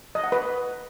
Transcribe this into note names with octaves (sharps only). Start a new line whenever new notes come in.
D#5
F#5
B4